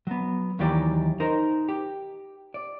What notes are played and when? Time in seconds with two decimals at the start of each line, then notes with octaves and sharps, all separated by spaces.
0.07 F#3 B3
0.59 D#2 D#3 E3 F#3 G4 D5
1.20 D#4 A#4 C5
1.69 G4
2.54 D5